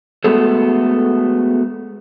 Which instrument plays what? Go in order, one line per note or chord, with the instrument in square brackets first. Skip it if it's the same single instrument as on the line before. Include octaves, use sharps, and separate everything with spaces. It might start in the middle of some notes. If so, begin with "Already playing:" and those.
[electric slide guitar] G#3 A3 B3 F#4 G#4 A4